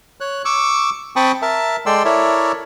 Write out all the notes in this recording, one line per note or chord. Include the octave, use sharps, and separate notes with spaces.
C#5 F#6
C#6 D6 E6
C4 G5 A5 B5 C#6 D#6
A#4 E5 A5
G#3 A4 D5 G5 C6 E6
E4 A4 A#4 C#5 D5 E5